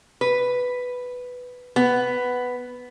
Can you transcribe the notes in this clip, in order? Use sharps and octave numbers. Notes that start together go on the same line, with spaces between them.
B4
B3